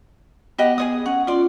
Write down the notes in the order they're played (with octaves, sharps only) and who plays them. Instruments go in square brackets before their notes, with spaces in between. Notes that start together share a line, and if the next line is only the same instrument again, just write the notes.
[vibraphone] B3 [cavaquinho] G4 D#5 F#5
[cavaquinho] G#4 C#5 D#6
[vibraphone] C#4 [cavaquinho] F#5
[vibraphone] F4 [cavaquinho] D5 C6